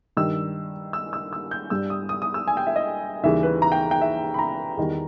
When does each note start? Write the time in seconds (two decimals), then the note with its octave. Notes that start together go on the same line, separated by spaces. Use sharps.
0.17 G2 D#3 G3 E6
0.93 E6
1.13 E6
1.33 E6
1.51 G6
1.70 G2 G3 E6
1.90 D#6
2.09 D#6
2.22 D#6
2.34 E6
2.48 G#5
2.57 G5
2.67 E5
2.76 D#5
3.23 D#2 C#3 E3 G3 E5
3.43 B4
3.62 A#5
3.72 G5
3.91 G5
4.01 E5
4.34 B5
4.39 A#5
4.77 E2 D#3 G3